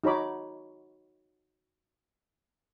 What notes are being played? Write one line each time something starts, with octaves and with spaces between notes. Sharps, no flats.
D#4 F#4 C#5 B5 D6